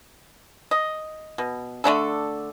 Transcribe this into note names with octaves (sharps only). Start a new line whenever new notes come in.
D#5
B2
D3 A3 D4 A4